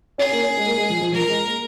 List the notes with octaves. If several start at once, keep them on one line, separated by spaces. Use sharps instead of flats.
C#4 G#4
A#3
C#4
G#3
A#3
G#3
F3
F3
F3 A#4
G#3
A#3